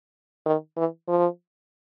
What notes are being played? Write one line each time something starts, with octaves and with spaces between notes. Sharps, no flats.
D#3
E3
F3